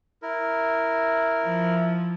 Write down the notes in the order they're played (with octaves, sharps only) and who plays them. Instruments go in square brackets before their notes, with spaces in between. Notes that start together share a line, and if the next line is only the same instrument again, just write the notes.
[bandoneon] E4 A#4
[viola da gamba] F3